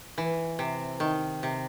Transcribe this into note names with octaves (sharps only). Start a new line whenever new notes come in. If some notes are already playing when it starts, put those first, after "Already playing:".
E3
C3
D#3
C3